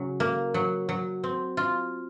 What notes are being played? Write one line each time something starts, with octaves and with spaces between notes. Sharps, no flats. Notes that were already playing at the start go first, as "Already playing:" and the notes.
Already playing: C#3 F#3 C#4
A#3
F#3
F#3
C4
F4